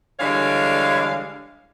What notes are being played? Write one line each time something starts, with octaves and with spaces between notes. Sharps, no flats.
D3 E3 G3 G#3 C#5 F5